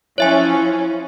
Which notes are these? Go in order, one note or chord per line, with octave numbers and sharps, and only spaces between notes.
F3 C#4 E4 C#5 E5 G#5